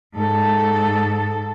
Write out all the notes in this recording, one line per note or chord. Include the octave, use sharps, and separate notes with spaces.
G#2 A4